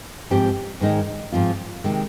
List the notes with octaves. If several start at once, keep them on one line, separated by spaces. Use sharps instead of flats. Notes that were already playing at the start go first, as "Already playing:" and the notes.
G#2 F3 C4 G4
G#2 D#3 G#3 D#4
G#2 F3 C4 F4
C3 D#3 G#3